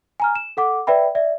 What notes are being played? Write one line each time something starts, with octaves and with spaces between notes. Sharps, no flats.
G#5 A#5 F6
E7
A4 F#5 D6
B4 D5 E5 G5 B5
D5 E5